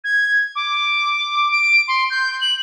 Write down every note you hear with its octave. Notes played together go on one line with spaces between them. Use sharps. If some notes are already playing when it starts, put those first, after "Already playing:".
G#6
D6
D7
C6
G6
F#7